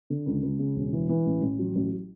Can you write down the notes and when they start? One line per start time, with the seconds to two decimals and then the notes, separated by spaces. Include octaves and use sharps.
0.10 D3
0.26 C#2
0.43 C#2
0.59 C#3
0.76 E1
0.93 E3
1.09 E3
1.26 A1
1.42 A1
1.59 F#3
1.76 A1